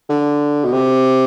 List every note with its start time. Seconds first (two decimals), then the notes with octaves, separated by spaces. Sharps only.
0.09 D3
0.65 B2
0.72 C3